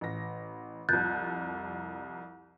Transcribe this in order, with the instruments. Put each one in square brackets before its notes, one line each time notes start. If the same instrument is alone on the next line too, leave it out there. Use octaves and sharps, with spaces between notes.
[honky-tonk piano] A1 A#6
[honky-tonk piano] C2 F2 [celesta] F#6 G6 A6